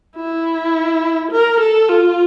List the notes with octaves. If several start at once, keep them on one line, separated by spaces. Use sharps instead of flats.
E4
A#4
A4
F4